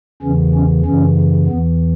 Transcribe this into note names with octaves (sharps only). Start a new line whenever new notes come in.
E2 C#3 E3 C#4
C#4
F#2 C#3 E3 C#4
E2 E3 B3